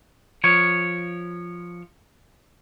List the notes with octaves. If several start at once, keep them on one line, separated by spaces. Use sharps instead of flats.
F3 C#5